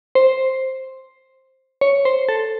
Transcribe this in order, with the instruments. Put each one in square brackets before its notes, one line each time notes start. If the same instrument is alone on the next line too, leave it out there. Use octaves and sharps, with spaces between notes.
[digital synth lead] C5
C#5
C5
A4